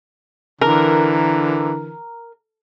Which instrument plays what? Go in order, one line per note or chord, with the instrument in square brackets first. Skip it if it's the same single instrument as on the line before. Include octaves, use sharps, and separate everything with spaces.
[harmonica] D3 E3 [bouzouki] A#4